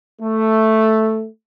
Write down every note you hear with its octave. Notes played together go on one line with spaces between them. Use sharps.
A3